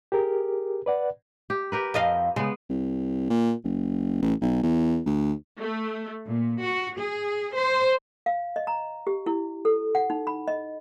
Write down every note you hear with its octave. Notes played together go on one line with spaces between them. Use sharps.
G4 G#4 A#4
B4 D5 F#5
G4
G4 A#4 B4
F2 D#5 F5
C#3 G#3 B3
C2
A#2
F#1
A1
B1
E2
D2
A3
A#2
F#4
G#4
C5
F5
D#5
A#5
G4
E4
A4
F#5
D#4
B5
D#5